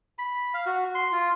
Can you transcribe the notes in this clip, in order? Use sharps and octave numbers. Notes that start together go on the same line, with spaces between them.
B5
F5
F#4
C6
F4